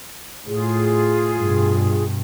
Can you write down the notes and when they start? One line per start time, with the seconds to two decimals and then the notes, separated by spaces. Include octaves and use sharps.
0.46 A2 F4 G#4
1.40 G2 B2